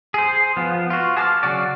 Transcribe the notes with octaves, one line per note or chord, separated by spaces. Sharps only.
G#4 C5
F3 B3
F4 F#4
G#4 A5 D6 F6
C#3 F#3 F#4 D5